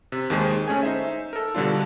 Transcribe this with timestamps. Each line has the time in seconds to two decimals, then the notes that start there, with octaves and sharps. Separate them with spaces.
0.12 C3
0.30 D#2 D#3 G#3 G#4 C5
0.68 A3 C#4 G#4 G#5
0.83 D#4 C5 E5
1.33 A4 A#4
1.55 B2 D3 G3 D4 F4